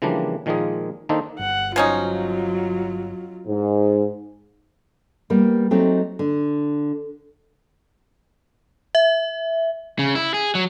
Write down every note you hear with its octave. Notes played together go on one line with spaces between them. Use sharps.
C#3 E3 F3 G3 A#3 D4
A#2 D#3 F3 G#3 A#3 G#4
D#3 A#3 D4 D#4 A4 C5
G1 F#5
F3 F#3 C#4 D#4 F4
G#2
G3 A#3 B3
F#3 A3 C4 D#4 G4
D3
E5
C#3
E4
G#4
F#3